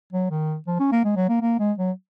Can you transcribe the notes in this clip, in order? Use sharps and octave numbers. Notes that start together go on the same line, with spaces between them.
F#3
D#3
F3
C#4
A#3
G#3
F#3
A#3
A#3
G#3
F#3